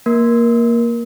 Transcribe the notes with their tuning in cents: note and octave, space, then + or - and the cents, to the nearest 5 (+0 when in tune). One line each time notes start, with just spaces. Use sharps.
A#3 +0 A#4 +20